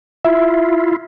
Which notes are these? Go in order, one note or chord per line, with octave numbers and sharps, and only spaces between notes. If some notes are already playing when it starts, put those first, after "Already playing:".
E4 F4 E5